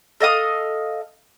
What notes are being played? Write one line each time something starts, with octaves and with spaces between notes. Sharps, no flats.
A4 D#5 F5 D#6